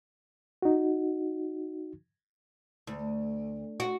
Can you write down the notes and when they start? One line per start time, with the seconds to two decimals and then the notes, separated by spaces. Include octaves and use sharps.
0.62 D#4 F#4
2.87 D2
3.80 F#4